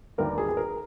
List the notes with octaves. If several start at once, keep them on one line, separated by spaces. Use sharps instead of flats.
D#2 D3 G3 A#3 A#4
G#4
G#4
A#4